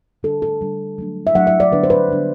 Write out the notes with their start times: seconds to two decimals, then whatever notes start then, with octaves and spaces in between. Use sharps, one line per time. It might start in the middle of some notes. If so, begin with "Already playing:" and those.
0.23 D3 G3 D4 A4
0.42 A4
0.61 D3 G3 D4
0.98 F#3 A3 D4
1.27 E5
1.35 F#3 A3 D4 F#5
1.47 E5
1.60 D5
1.72 D3 G3 B3 D4 B4
1.84 C5
1.90 B4
2.09 D3 G3 B3 D4